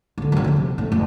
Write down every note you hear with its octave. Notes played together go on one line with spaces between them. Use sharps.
D1 D3
F#2 C#3
F2 C#3
C3
A2
F1